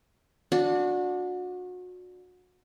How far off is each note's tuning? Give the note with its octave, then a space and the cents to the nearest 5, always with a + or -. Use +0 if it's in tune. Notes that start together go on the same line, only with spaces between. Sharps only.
D4 +0 F#4 -30